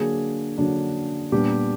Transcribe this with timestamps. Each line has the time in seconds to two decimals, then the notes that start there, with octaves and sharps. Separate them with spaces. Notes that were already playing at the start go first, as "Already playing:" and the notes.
Already playing: D3 F#3 A#3 D4 G#4
0.58 D3 F#3 A#3 D4
1.32 A#2 G3 B3 D4 G4